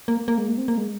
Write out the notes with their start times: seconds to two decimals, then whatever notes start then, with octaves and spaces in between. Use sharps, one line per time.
0.08 A#3
0.28 A#3
0.38 G#3
0.48 A#3
0.58 C4
0.68 A#3
0.78 G#3